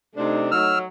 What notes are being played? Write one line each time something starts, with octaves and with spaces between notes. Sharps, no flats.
C3 A3 D4 D#4
F#3 E6 F6